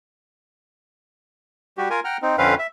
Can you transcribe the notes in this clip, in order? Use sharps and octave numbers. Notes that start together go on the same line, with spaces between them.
G3 F#4 G4
F4 A#4 G#5
F#5 G5 A#5 F6
C4 D#4
F2 D3 C4 C#4 B4 F5
E5